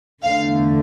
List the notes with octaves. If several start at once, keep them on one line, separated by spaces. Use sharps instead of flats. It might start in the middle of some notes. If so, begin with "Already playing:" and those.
E2 D3 A3 F5